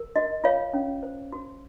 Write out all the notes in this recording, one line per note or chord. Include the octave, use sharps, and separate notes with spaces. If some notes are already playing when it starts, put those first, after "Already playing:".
Already playing: A#4
F#4 D#5
F4 C#5 F5
C#4
C5
F#4